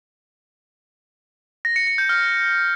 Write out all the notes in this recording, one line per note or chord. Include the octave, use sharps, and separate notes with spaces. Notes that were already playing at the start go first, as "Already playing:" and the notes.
A#6
C#7
C#7
G6
F6